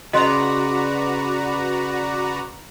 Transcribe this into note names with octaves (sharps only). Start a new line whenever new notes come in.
C#3 F#4 B4 D5 D#5 A#5 C6